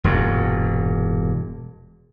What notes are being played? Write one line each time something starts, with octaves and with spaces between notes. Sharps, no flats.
E1 G2 A#2